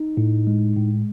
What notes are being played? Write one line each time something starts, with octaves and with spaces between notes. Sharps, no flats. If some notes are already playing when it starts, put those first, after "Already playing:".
Already playing: D#4
A2
G#3
A2